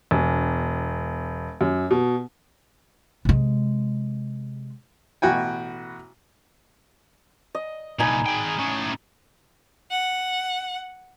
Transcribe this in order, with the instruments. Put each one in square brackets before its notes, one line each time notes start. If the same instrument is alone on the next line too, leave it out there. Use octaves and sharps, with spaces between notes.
[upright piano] E1
F#2
B2
[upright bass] C3 G#3
[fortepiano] A1 B2 F#4 G5 G#5
[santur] D#5
[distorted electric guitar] C2 A#2 [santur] D#4 G#5 B5
[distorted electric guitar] G#3 G5
A2 C#4
[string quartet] F#5